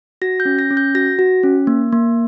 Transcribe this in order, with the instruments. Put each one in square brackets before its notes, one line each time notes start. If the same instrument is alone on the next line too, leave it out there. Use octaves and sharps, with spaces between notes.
[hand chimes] F#4 A#6
G6
C#4
A#6
C#4
G6
F#4 A#6
F#4
C#4
A#3
A#3